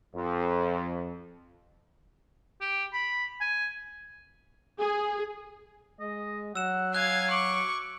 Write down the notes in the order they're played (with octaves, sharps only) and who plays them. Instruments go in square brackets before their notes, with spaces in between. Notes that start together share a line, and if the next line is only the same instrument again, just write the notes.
[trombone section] F2
[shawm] G4
B5
G#5
[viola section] G#4
[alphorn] G#3 [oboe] D#5
[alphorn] F#3 [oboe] F#5 [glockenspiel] E6 E7
[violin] F5 G#6 [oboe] G#5 [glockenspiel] F#6
[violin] C#6 [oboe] D6 [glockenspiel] F#7